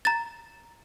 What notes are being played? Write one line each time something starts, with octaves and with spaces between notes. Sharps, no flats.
A#5 A6